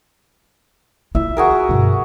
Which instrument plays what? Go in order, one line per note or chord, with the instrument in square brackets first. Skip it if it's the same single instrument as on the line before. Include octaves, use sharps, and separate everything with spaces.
[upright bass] E4 F4 [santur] E5
[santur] F#4 G#4 A#4
[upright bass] G1 B2